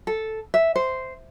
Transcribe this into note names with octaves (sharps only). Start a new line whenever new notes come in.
A4
E5
C5